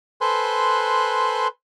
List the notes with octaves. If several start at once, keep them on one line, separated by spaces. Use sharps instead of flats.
A4 B4 C5 G#5 C6 F#6